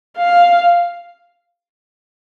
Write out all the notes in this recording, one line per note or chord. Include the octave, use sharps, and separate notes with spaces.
F5